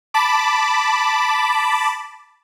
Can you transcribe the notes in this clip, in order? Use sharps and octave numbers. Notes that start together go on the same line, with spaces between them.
A5 B5 D6